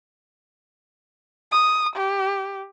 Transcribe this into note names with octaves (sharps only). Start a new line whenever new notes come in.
D#6
G4